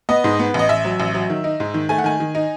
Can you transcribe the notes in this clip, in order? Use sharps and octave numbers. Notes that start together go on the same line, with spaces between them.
B3 D#5
G#2
B3
A1 D#5
A1 E5
F#3
A1
F#3
D#3
D#4
G#2
D#3
A3 G#5
F#5
D#3 G#5
D#3
D#4